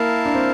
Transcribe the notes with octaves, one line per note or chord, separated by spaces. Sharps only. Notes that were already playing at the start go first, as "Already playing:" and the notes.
Already playing: A#3 E4 A#4 F5 A5
D4
C4